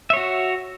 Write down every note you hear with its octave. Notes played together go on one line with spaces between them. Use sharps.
F#4 C#5 E5